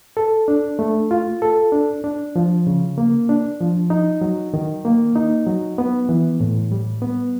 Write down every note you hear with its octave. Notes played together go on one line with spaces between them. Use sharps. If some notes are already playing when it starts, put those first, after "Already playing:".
A4
D4
A3
F4
A4
D4
D4
F3
C#3
A#3
D4
F3
D#4
F#3
D#3
A#3
D#4
F#3
B3
E3
A2
G3
B3